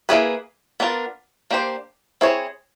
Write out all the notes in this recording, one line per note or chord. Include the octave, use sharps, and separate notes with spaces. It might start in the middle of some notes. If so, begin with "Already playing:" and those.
A#3 C#4 E4 G#4 B4
B3 D4 F4 A#4
A#3 D4 G4 C5
C4 E4 G#4 C#5